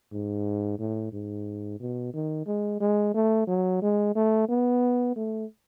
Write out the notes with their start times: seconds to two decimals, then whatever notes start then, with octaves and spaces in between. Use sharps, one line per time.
0.12 G#2
0.79 A2
1.13 G#2
1.80 B2
2.14 D#3
2.47 G#3
2.81 G#3
3.14 A3
3.47 F#3
3.82 G#3
4.15 A3
4.49 B3
5.16 A3